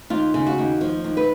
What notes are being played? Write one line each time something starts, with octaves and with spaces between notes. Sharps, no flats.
D#2 F4
C#3
F#4
D#2
F3
D#2
B4